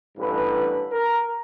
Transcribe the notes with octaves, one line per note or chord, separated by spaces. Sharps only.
A1 G2 D3 B4
A#4